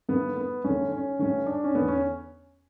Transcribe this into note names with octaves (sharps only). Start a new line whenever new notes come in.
G2 D3 B3
B3
G2 D3 C#4
C#4
G2 D3 C#4
D4
C#4
E2 D3 B3
C#4